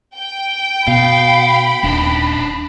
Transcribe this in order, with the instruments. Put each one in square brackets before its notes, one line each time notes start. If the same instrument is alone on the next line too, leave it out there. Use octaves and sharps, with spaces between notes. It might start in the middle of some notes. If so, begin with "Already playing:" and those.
[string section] G5
[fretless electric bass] B2 [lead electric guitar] F5 [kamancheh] B5
[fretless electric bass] D#1 [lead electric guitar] D4 D#4